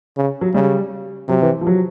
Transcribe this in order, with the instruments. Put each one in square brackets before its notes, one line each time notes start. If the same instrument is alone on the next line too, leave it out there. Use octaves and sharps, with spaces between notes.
[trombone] C#3
[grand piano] F#3
[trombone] C#3 [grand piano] G3
[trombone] C3 [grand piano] F#3
[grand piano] E3
F3
F#3